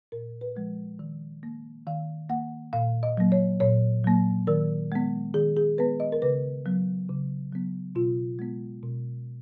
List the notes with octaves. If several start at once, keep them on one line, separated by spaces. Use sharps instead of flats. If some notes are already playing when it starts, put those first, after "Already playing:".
A#2 A#4
B4
F3 G#3
D#3
A#3
D#3 F5
A#3 F#5
A#2 F5
D#5
F#3 A#3
C#5
A#2 C#5
F#3 A#3
D#3 A#4
G#3 B3
D#3 G#4
G#4
G#3 B3 B4
D#5
A#4
C#3 B4
F#3 B3
C#3
F#3 B3
B2 F4
G#3 B3
B2